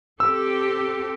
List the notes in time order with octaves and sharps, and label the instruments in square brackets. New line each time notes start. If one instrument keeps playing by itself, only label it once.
[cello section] C4 G4 A4 [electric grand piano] E6